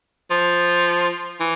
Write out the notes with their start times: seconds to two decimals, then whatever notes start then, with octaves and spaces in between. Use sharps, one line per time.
0.31 F3
1.40 E3